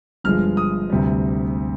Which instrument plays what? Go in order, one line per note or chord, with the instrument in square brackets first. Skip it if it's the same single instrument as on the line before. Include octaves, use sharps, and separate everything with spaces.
[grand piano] G1 G2 F3 G#3 F6
D#6
D2 C3 G3